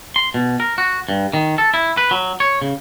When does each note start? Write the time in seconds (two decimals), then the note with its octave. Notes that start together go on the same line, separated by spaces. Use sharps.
0.16 C6
0.34 B2
0.60 A#4
0.78 F#4
1.09 G2
1.33 D#3
1.58 A4
1.74 E4
1.97 B4
2.11 F#3
2.40 C#5
2.62 C#3